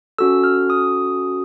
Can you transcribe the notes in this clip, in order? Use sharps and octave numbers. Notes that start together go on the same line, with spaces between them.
C#4 F#4 A4 E6
F6
D#6